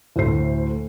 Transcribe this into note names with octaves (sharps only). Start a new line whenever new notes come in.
D2 A2 A3 C5 C7